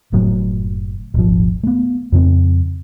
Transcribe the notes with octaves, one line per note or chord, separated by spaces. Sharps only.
F#1 F#2 A2 F#3
D#1 G#1 F3
A3 B3
F2 C#3 C4